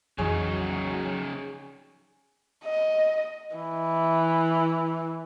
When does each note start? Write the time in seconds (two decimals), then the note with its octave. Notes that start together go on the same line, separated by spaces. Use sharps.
0.18 A#1 F2 C#3 E3 F#3 D#4 G#4 C#5
2.65 D#5
3.56 E3